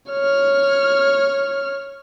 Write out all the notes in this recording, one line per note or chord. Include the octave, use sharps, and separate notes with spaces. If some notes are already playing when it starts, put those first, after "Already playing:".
C#5 F6